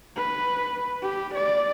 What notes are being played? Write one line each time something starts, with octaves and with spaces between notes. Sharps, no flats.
B4
G4
D5